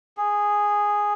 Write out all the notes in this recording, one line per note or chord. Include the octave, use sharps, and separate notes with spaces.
G#4